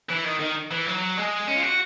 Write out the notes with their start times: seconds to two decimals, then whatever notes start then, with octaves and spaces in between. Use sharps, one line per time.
0.09 E3
0.24 D#3
0.40 D#3
0.71 E3
0.86 F#3
1.17 G#3
1.48 C#4
1.56 F4
1.63 F#4